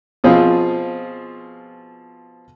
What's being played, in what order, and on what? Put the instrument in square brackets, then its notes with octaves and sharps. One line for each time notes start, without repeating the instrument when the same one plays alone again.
[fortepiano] B2 F3 C4 F4 G#4